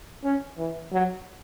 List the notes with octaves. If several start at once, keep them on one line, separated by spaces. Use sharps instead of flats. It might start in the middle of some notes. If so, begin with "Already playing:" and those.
C#4
E3
F#3